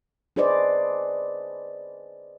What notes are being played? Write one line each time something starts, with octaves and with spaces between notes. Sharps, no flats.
D4 G#4 B4 C5 D5 D#5